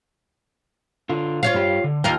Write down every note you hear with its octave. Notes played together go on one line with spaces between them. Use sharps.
D3 F4
F4 C#5 F5
G2 G4
D3
D#2 F4 A#4 G5